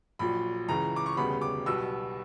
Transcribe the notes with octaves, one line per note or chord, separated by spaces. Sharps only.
A#1 A#2 F#3 B5
C#2 C#3 E3 A#5
D6
C#6
E1 D2 C#3 G3 B3 B5
D6
B1 B2 G3 B3 E6